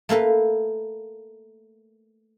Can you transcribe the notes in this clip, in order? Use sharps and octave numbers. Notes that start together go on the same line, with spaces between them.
A3 A#3 A4 B4